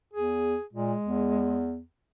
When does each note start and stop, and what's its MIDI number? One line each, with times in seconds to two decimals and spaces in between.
0.14 0.56 40
0.14 0.63 68
0.73 0.94 46
0.73 1.69 56
1.05 1.83 40